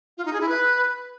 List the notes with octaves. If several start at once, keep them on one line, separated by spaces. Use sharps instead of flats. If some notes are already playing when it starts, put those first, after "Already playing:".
F4
D#4
G#4
E4
B4